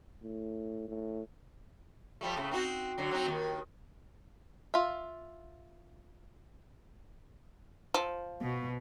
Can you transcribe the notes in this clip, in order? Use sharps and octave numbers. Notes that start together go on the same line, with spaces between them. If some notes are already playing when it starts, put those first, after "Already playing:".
A2
A2
F3 G3 A3
A2 C#3 A3
C4 D#4 F#4
D3 F#3
F#3 C4 D#4
D#2 D#3
F4 E5
F3
B2